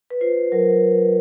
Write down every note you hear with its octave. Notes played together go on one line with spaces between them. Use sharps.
B4
F4 C5
F#3 A#4